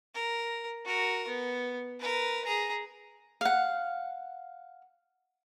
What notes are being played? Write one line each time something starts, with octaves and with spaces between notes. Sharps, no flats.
A#4
F#4 A#4
B3
A#4 B4
G#4 A#5
F5 F#5